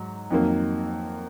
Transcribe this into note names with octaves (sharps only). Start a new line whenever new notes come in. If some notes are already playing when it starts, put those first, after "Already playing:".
Already playing: G#2 F#3
F2 D#3 F#3 A#3